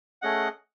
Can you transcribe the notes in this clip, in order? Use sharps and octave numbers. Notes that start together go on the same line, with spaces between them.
A3 C#4 G#4 D#5 F#5